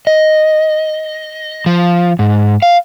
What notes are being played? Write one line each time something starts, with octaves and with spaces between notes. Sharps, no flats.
D#5
F3
G#2
F5